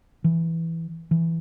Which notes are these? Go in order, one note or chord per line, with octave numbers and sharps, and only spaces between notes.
E3
E3